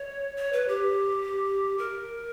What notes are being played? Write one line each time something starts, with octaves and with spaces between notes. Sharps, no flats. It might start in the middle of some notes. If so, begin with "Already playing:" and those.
Already playing: C#5
C#5
B4
G4
A#4